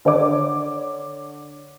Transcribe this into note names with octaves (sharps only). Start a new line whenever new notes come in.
D3 C#5 D5 D6